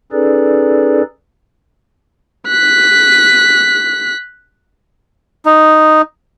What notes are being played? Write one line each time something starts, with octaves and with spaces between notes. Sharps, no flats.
C#4 D#4 G#4 A4 B4 D5
F#6 B6
D#4